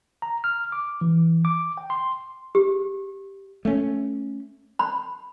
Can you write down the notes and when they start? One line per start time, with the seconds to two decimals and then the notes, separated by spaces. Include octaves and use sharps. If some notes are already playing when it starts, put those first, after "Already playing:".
0.22 A#5
0.44 F6
0.72 D6
1.01 E3
1.45 D6
1.77 G5
1.90 C6
2.55 G4
3.65 A3 C#4
4.79 B5